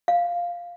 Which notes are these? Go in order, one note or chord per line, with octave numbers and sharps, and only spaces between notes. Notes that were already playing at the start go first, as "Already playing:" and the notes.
F5